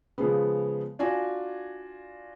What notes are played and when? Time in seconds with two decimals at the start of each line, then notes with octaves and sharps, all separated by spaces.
0.18 C#3 F3 G#3 B3
0.99 D4 F4 F#4 G#5